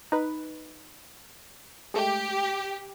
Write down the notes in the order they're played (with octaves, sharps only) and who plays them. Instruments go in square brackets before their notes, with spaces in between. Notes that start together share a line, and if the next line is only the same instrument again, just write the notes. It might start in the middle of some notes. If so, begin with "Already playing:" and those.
[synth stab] D#4 B4
[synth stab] G#3 A3 [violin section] G4